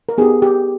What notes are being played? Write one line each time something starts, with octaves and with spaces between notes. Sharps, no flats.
A#4
B3 D#4 G4 G#4
G4